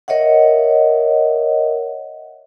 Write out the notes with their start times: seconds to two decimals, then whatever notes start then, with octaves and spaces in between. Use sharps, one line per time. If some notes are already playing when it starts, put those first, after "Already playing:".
0.08 A#4 C#5 D#5 E5 F#5